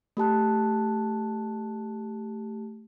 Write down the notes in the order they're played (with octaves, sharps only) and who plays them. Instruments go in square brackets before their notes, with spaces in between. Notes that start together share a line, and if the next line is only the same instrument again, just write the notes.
[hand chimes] A3 G4 A5 F#6